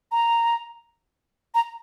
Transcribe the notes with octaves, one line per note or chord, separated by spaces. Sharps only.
A#5
A#5